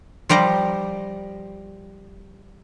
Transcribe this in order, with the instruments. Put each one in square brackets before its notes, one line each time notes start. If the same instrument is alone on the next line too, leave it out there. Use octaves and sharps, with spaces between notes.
[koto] F3 G3 G4 A#5